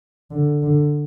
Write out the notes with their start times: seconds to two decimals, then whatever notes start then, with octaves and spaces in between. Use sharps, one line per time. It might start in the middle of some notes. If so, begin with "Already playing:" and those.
0.31 D3
0.63 D3